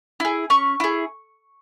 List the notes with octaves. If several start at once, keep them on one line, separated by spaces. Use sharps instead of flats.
E4 G#4
C#4 C#6
E4 G#4